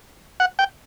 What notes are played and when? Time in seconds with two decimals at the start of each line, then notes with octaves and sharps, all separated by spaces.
0.40 F#5
0.59 G5